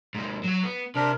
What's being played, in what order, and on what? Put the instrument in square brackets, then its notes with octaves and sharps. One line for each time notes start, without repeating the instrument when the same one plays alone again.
[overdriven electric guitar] G#2 A#3
F#3 F#4
B3
[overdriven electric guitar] C3 [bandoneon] D4 A#4